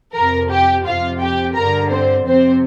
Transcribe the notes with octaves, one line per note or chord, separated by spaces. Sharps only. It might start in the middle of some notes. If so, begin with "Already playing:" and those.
F2 C3 A#4 A#5
G4 G5
F2 C3 F4 F5
G4 G5
G2 D3 A#4 A#5
C4 C5
F2 C3 C4 C5